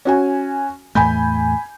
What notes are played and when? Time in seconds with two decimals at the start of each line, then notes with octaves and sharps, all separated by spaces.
0.05 C#4 F#4 G#5
0.95 E2 A2 A3 G#5 B5 G6